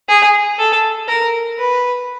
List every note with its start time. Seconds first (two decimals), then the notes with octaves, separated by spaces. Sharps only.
0.09 G#4
0.59 A4
1.09 A#4
1.59 B4